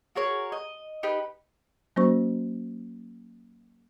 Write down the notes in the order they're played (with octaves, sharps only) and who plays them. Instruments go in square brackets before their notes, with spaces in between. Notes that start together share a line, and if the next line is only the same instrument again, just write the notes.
[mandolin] F#4 G#4 A#4 C#5
D#5
D#4 G4 B4
[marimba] F#3 A#3 C#4 F#4 C5 C#6